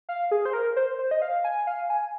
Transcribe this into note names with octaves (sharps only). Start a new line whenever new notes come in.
F5
G#4
C5
A#4
C5
C5
D#5
F5
G#5
F5
G#5